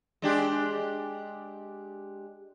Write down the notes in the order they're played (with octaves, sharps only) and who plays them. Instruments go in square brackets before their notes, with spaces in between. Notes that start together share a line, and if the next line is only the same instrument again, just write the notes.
[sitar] G#3 D4 G4